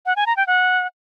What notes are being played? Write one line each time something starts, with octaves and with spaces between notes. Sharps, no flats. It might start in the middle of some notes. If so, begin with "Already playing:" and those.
F#5
G#5
A#5
G5
F#5